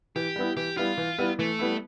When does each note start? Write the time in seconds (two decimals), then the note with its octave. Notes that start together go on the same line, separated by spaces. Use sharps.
0.16 E3 G4
0.36 G3 B3 E4
0.57 E3 G4
0.77 G3 B3 E4 F4
0.97 E3
1.18 G3 B3 E4
1.39 E3 A3
1.59 G3 B3 E4